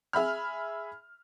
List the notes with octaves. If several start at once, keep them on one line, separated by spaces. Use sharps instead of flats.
G#4 E5 B5 F6